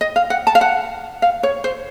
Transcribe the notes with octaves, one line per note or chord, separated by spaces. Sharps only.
D#5
F5
F#5
A5
F5
F#5
F5
C#5
C5